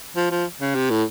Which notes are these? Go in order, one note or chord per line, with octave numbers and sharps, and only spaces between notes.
F3
F3
C#3
C3
A2